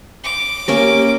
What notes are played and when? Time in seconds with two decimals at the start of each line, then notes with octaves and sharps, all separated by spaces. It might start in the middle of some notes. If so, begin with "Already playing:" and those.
0.24 D6
0.68 A#3 C#4 G4 A#4